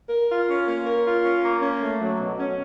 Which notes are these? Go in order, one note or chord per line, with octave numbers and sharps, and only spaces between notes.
A#4
F4
C#4
A#3
A#4
F4
C#4
A#3
C#4
A3
F#3
B2
C#4